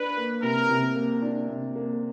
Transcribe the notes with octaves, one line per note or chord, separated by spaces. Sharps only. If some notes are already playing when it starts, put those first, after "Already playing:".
Already playing: D4 B4
A#3
C3 A#4
C3
A#3
D4
C3
A#3